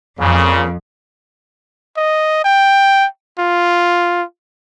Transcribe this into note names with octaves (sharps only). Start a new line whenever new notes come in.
F2 A#2 C#3
D#5
G5
F4